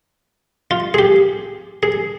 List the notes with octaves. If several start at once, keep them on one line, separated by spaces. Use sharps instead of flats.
F4
G#4
G4
G#4